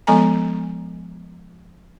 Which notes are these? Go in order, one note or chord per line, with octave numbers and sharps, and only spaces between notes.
F3 G#3 B3 A4 G#5 A#5